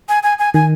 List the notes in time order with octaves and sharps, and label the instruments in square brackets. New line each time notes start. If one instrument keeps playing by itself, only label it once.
[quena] G#5
G#5
G#5
[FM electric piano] D#3 [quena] G#5